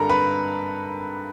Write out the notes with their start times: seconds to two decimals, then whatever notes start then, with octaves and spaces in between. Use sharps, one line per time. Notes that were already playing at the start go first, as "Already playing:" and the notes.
Already playing: G2 D3 G3 A4 A#4 A#5
0.09 B4 B5